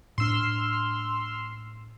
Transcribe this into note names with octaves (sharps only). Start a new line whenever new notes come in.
A2 D4 C6 E6 F6